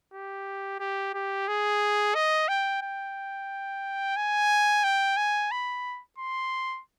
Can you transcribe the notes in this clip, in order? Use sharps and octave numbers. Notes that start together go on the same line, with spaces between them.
G4
G4
G4
G#4
D#5
G5
G5
G#5
G5
G#5
B5
C6